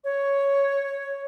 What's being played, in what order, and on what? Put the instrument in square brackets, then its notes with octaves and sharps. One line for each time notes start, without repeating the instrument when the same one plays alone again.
[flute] C#5